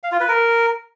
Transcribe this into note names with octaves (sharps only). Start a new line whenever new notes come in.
F5
F4
B4
A#4